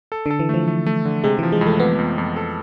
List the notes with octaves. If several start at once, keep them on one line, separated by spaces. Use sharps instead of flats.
A4
D3 A4
E3
F3 A3
A3
A3
D3
C3 G#3
E3 F3
G#3
F2
A3
F2 B3
F2
F2
A4